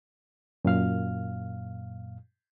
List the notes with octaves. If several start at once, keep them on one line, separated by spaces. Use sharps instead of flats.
F#2 A#2 F5 F6